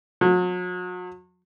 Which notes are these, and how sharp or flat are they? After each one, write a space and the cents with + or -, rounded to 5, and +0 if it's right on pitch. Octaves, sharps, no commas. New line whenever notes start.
F#3 -40